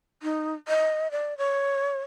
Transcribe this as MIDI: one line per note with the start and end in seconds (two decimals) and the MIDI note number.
0.23 0.54 63
0.68 1.11 75
1.11 1.37 74
1.38 2.01 73